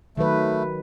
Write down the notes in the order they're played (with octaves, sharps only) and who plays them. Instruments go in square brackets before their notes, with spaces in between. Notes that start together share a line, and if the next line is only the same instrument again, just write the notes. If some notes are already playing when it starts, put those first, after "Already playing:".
[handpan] D#3 F#3 B4 [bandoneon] A3